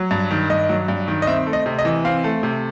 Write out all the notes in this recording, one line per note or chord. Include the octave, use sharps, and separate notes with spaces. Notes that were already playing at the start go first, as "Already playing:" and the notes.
Already playing: F#3
G2
D#3
G2 D#5
F#3
G2
D#3
D#5
C4 E5
A3
D#5
C3
D#5
E3
C4 F5
A3
C3